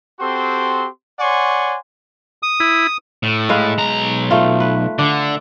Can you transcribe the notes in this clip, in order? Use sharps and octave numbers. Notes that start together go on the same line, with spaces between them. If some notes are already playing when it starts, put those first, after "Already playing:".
C4 F#4 G4 A4 C6
C#5 D5 F#5 G#5 C6 C#6
D#6
E4
A2
G#3 B4 F5
B1 A#5
A3 F4
B4
D3 D4